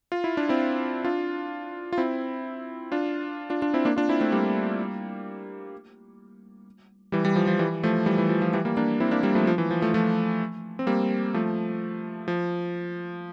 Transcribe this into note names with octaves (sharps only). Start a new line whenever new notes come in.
F4
E4
D4
C4 E4
D4 F4
F4
C4 E4
D4 F4
D4 F4
D4 F4
C4 E4
A#3 D4
D4 F4
C4 E4
A3 C4
G3 A#3
E3 G3
E3 G3
F3
F3
E3 G3
F3 A3
E3 G3
E3
F3
F3
E3 G3
G3 A#3
A#3 D4
C4 E4
A#3 D4
G3 A#3
F3 A3
F3
E3
F3
F3 A3
F3 A3
C4
G3 A#3
F3 A3
F3